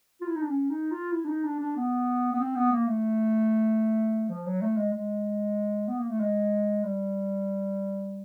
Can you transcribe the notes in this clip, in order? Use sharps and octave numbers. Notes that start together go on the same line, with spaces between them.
F4
E4
D#4
D4
C#4
D#4
F4
E4
D4
D#4
D4
D4
B3
B3
C4
B3
A#3
A3
F3
F#3
A3
G#3
G#3
B3
A#3
A3
G#3
G3